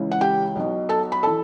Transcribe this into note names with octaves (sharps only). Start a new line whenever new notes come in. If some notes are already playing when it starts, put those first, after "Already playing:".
Already playing: C#2 C#3 E3
F#5
G4 G5
B1 B2
A4 A5
B5
E3 A4 A5